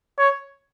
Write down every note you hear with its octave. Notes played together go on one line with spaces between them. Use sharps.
C#5